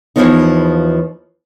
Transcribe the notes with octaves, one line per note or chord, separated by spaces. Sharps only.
D#2 A2 E3 F3 B3 D#4